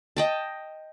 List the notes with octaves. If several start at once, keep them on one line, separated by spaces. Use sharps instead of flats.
D#5 G5 A5